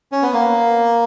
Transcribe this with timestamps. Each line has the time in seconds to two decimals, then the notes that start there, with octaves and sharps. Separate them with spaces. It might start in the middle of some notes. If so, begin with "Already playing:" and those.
0.12 C#4
0.23 B3
0.33 A#3